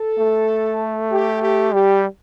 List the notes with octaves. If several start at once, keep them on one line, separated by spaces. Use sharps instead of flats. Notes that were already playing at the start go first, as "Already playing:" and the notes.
Already playing: A4
A3
G4
G4
G3 G4